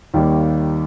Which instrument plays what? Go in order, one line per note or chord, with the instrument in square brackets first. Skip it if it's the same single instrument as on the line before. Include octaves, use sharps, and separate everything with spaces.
[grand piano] D#2 D#3 G3 A#3 D#4